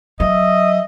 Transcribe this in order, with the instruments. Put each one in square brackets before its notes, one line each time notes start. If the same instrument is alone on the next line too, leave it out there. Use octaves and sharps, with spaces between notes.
[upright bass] F#3 [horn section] D#5 E5